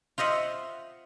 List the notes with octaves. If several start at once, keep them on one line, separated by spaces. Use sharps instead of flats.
F4 C5 D#5 E5 F#5